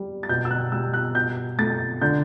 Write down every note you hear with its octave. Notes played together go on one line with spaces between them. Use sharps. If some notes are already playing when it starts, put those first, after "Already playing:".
Already playing: G3
A6
B2 G6
E6
F#6
G3 E6
F#6
B2 G6
A3 A6
D3 G6